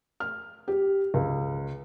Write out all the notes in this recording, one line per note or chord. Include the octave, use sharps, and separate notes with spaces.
F6
G4
C#2